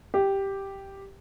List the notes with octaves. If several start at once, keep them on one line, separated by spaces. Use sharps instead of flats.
G4